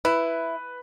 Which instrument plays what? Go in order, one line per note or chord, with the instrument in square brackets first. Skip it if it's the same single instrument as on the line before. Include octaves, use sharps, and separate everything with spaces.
[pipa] E4 [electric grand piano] B4